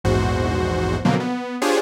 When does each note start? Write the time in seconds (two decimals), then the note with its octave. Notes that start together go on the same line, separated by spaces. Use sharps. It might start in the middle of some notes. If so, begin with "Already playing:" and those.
0.04 A#1 E2 G#2 F#4 C5
1.05 B2 D3 F3 F#3 A#3 C4
1.20 B3
1.62 D4 F4 G4 G#4 C5 C#5